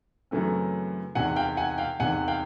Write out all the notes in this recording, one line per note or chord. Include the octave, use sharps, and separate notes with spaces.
F#2 C#3 E3 A3 C4
E2 C3 D#3 F#5 G#5
F5 G5
F#5 G#5
F5 G5
E2 C3 D#3 F#5 G#5
F5 G5